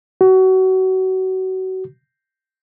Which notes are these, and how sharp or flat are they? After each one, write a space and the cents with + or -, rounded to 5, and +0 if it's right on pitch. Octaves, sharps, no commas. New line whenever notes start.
F#4 +30